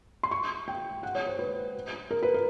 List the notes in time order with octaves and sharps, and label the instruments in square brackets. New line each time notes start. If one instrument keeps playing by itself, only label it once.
[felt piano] C6
C#6
G5
F#5
C#5
C5
B4
A#4
B4
A#4